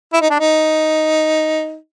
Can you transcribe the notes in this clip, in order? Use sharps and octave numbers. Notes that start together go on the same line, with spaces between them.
E4
D#4
D4
D#4